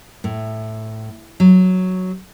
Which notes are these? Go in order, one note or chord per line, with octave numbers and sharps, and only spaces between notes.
A2
F#3